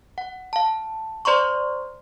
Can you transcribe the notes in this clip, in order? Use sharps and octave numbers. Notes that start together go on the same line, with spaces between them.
F#5
F5 A5
C5 D5 A#5 C6 C#6